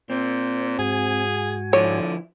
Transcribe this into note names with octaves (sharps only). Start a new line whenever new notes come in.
A#2 C4
G#2 F#4 G#4 G#5
D3 F3 D4 E4 C#5